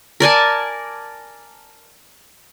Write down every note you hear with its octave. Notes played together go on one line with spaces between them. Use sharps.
A#4 D5 G#5 A5